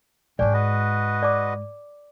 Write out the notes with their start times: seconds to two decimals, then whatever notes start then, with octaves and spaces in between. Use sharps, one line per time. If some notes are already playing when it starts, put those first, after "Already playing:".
0.39 G#2 G#3 C#4 D4 D5 G5
0.54 F#4 B4 D#5
1.23 D5 D6